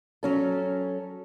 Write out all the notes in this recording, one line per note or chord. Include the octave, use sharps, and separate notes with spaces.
F#3 C#4 A4